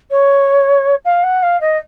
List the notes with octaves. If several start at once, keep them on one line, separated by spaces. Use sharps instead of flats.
C#5
F5
F#5
F5
D#5